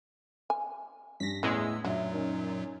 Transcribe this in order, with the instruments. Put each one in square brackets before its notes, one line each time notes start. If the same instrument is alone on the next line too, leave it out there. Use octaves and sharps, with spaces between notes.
[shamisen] G#5
[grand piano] G2 [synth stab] A#6 B6
[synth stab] E2 G#3 [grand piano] A2 [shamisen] C#4 [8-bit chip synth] E6
[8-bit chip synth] F#2 A#2 F#3 [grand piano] D4 E5 [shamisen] F#4
[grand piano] C#4 D#4 A#4